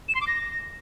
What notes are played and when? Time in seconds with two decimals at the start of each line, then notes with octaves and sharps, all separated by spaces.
0.09 E7
0.15 C6
0.21 D6
0.27 A#6